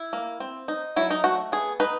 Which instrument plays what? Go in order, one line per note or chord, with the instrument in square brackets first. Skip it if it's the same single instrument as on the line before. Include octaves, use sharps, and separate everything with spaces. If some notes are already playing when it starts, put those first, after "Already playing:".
Already playing: [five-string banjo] E4
A#3
C4
D#4
F#3 E4
D#4
A3 F#4
B3 G#4
D#4 B4